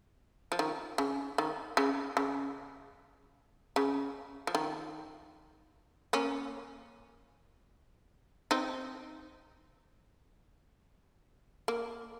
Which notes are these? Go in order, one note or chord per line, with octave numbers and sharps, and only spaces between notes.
F3
D#3
C#3
D#3
C#3
C#3
C#3
F3
D#3
A#3 C#4
C4 D#4
A#3